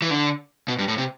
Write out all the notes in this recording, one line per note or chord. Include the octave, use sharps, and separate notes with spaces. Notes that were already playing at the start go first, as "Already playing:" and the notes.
E3
D3
B2
G2
A2
C3